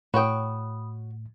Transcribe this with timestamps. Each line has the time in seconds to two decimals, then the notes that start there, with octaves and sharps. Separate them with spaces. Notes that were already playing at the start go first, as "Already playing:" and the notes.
0.14 A2 F#4 C#5 G5 B5 D#6